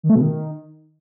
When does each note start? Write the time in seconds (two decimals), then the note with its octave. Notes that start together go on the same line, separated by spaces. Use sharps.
0.03 D#3
0.09 A3
0.15 B2
0.21 D#3